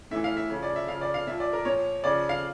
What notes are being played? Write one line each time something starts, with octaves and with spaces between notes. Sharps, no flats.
A2 E3 E5
F5
E5
C#3 F3
D5
E5
C#3 F3 F5
D5
F5
A#2 F3 E5
D5
A#4
A#2 F3 C#5
C#3 F3 D5
F5